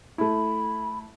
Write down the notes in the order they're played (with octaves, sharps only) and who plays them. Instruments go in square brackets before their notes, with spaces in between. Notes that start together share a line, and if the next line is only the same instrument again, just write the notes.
[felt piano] A3 E4 [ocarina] B5